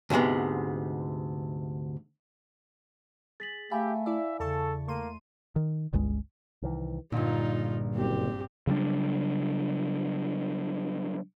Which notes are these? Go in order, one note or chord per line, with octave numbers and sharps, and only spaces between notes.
D2 G#2 C3 G#3 B3
G#4 A6 B6 F#7
A3 G4 E5 F5 G#5 B5
E4 D5 E5
E2 C#3 A4 A5 C#6
A3 A#3 C6 D#7
D#3
G1 C#2 G2 G#3
C2 D#3 E3
A#1 G2 A#2 D3 D#4 F4
F#1 C4 G4
C#3 F#3 G3 D4